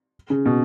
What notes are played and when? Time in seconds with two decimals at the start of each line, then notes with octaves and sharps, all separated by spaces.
0.30 C#3
0.45 B2